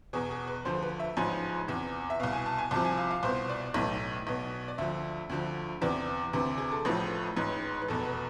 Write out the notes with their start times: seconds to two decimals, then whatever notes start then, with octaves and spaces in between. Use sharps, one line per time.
0.13 E2 B2 G#4
0.31 G#4
0.47 B4
0.65 D2 D3 F3 C5
0.82 B4
1.00 E5
1.17 A1 G#2 F3 G#5
1.68 E2 C3 E3
2.10 E5
2.20 C2 B2 F5
2.33 G#5
2.46 A5
2.58 G#5
2.71 C2 C3 F3 A5
2.85 G#5
2.98 F5
3.11 F5
3.23 C2 B2 C5
3.49 D5
3.74 B1 A2 E3
4.27 B1 B2
4.68 D5
4.78 D2 D3 F3 E5
5.29 D2 D3 F3
5.81 E2 C3 E3 D5
6.33 D2 C3 E3
6.58 G#4
6.72 A4
6.85 A1 A2 F3 B4
7.37 A1 G#2 E3
7.82 B4
7.88 F1 E2 B2 A4
8.05 B4